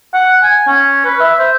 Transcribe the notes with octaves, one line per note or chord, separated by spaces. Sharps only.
F#5
G#5
C#4
B4
E5
C5